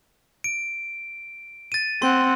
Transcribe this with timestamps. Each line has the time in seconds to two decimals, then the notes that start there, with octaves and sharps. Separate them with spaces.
0.44 D7
1.72 A6 D#7
2.02 C4 F#5 C6